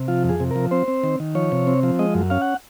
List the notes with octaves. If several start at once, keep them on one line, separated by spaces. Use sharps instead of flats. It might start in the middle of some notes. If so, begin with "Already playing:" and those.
Already playing: C3
F3 F4
F2 G#4
C3
F3 A#4
C4 C5
C4
D#3
D#3
F3 C#5
C3
C4
F3
G#3 D#5
F#2
C#4 F5
F#5